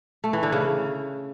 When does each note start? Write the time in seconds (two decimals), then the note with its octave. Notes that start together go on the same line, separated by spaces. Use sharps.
0.24 A3
0.33 E3
0.43 D3
0.52 C#3